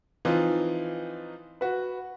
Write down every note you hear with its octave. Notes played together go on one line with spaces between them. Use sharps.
E3 F3 C4 D#4 F4
F#4 B4